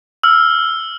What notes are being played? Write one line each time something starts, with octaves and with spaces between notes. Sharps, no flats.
E6 F6